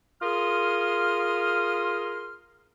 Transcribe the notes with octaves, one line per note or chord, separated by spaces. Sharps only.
F4 G#4 A#4 C6 D#6 F6